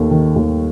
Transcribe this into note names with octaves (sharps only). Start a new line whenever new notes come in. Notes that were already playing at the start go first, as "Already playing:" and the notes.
Already playing: D#2 D#3 A3
D#3
D#2